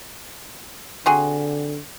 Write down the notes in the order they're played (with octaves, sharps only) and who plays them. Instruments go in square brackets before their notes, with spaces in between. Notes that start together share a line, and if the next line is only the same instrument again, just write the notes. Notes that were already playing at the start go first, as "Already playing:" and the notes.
[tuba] D3 [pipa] C4 F#4 G#4